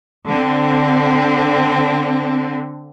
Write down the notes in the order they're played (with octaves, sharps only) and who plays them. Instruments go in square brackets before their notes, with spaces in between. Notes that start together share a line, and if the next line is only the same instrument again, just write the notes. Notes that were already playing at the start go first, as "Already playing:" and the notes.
[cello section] D3 C4